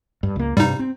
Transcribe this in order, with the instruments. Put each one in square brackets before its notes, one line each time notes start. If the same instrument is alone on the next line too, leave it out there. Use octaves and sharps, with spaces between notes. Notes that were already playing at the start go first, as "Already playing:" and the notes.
[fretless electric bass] G2
C#2 A#3
[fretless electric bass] G2 C3 [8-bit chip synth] G3 D#4
[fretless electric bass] C4